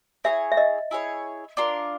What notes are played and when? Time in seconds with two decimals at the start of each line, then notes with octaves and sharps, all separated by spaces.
0.24 E4 G#4 C#5 E5
0.52 E5
0.57 D#5
0.91 E4 G#4 C#5
1.57 D4 F4 A#4